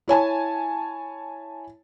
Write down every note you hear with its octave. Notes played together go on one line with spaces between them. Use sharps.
E4 C#5 G#5 A5